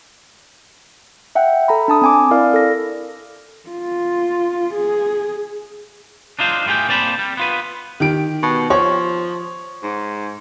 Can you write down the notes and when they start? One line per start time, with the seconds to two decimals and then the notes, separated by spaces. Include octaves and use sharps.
1.35 E5 F#5 G5
1.68 A4 A#5 B5
1.88 D4 A5 D#6
2.02 C4 G#5 D6
2.31 E4 A#4 D5 F5 F6
2.53 A4 A#6
3.70 F4
4.74 G#4
6.39 D4 D#4 F4 C5
6.66 A2 F4 G4 G#4 G5
6.88 A#3 C4 D5 A5 B5
7.19 G3
7.37 B3 F4 B4
8.00 D#3 G4 D7
8.43 B2
8.70 F3 C#5
9.83 G#2